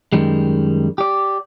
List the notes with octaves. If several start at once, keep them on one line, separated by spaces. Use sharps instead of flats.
F#2 D#3 G3 G#3
G4 D5